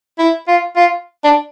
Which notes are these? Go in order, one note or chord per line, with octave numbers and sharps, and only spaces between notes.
E4
F4
F4
D4